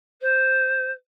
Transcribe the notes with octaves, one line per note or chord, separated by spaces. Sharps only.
C5